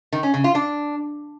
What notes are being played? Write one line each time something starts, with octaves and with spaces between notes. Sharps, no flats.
D#3
C#4
C#3
F4
D4